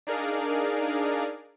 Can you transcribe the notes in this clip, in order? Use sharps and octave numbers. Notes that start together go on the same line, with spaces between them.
D4 D#4 G#4 A#4 D5 F5